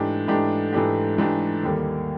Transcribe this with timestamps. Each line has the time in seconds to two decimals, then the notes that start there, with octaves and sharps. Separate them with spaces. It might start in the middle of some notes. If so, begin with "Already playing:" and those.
Already playing: G#2 E3 A3 D4 G4
0.28 G#2 E3 A3 D4 G4
0.73 G#2 E3 A3 D4 G4
1.18 G#2 E3 A3 D4 G4
1.63 D#2 D3 G3 A#3